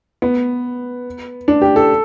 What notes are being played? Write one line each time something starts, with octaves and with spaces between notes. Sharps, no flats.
B3
D4
G4
A4